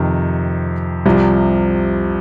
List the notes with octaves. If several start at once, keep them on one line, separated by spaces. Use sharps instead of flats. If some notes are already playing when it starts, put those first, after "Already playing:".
Already playing: F2 C3 D#3
C2 C3 F3